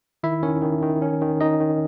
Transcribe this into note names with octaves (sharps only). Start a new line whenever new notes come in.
D#3 E4 E5
D#3 C#4 C#5
D#3
D#3
C#4
D#3
D#3 D#4 D#5
D#3